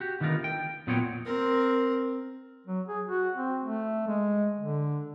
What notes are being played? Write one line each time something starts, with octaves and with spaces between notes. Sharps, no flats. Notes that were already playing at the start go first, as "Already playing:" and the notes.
F#4 G4
D3 D#3 A3 B3 F4 A#4
G5
A#2 F#3 B3 F4 C#5 G5
C4 A#4
F#3
G#4
F#4
C4
A3
G#3
D3